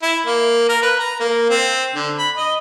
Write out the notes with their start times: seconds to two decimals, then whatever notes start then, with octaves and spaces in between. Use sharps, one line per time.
0.02 E4
0.26 A#3
0.69 A#4
0.82 B4
0.99 A#5
1.20 A#3
1.49 C4
1.94 D3
2.18 B5
2.37 D#5